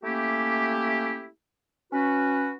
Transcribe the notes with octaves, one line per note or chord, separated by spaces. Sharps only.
A3 A#3 C#4 E4 G4
C#4 F#4 B4